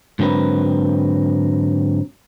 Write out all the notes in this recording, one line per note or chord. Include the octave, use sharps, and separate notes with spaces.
G#2 D3 F#3 C4 A#4 B4